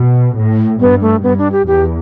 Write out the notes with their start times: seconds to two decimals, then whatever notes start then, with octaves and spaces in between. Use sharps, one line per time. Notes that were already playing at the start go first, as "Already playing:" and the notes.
Already playing: B2
0.36 A2
0.80 G2 B3
1.01 A3
1.23 G2 B3
1.38 D4
1.52 G4
1.67 E2 G4